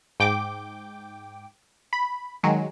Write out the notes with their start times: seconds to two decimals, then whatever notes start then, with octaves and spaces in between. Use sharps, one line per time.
0.20 G#2 G5 D6
1.93 B5
2.43 D#3 F#3 G#3